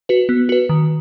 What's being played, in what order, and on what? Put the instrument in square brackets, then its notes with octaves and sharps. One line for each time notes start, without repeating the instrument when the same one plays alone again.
[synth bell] F#4 B4
B3
F#4 B4
D#3